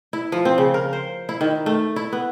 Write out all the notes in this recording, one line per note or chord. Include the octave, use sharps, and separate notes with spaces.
E4
F3
C4
C#3
A#4
C5
E4
D#3
A3
E4
B3